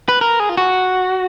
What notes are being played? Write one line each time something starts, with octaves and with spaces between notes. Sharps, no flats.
B4
A#4
G#4
F4
F#4